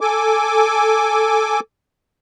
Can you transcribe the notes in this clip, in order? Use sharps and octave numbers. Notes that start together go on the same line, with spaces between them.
A4 G#5 D6